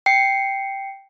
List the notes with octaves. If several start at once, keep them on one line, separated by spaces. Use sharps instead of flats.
G5 C7 C#7